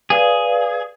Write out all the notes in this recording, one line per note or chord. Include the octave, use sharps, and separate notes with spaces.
G#4 B4 D5 F5